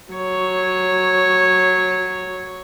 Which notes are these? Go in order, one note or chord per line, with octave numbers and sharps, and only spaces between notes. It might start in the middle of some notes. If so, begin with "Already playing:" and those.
F#3 C#5